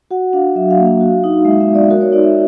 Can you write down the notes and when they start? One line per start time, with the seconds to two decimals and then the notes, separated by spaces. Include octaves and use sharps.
0.11 F#4 F#5
0.33 D4 F5
0.55 F#3 E5
0.70 F5
0.78 A#3
0.86 F5
1.01 F#4
1.24 D#4
1.45 G#3 E5
1.61 E5
1.68 B3
1.75 D5
1.90 F#4 A#4
2.01 C#5
2.12 D#4 D5
2.23 E5